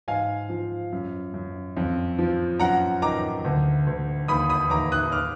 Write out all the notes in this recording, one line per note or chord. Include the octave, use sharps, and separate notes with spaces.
G#2 F5 G#5
F3
F#2
F#2
F2
F3
F#2 F#5 A#5
D#3 A#5 D6
D2
D2
D#2 B5 D#6
B5 D#6
D#2 A#5 D6
D#6 F#6
D6 F6